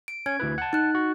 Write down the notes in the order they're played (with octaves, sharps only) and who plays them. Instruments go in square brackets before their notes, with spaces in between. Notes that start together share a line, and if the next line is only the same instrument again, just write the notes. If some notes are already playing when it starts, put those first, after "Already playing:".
[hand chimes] D7
[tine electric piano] C#4 [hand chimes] G#6
[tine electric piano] D2 E4 B4
F#5 A5
[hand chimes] D#4 F#6
[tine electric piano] F#4